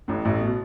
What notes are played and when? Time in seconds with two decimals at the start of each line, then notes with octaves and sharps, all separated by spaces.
0.08 A1 A2
0.25 A1 A2
0.41 B2